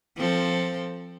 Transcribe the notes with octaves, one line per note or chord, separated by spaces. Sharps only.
F3 C4 A4